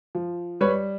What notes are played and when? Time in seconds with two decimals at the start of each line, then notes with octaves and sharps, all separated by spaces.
0.15 F3
0.61 G3 B4 C#5